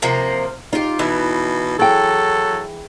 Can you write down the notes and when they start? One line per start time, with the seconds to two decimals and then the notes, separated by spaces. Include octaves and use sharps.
0.02 C3 F3 A#3
0.73 D#4 F4 G4
0.99 B2 E3
1.79 F#3 G#4 A4 G5